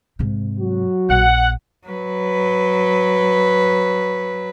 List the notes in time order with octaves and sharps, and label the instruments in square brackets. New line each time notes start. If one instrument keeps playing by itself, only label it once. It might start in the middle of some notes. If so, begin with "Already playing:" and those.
[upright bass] G#2 C3
[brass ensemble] F#3 F#4
[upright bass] A#1 [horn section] F#5
[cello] F#3 B4